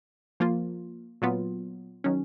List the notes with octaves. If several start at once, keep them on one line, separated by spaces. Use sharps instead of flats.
F3 A#3 F4
A#2 F#3 B3 F4
D#3 F#3 C#4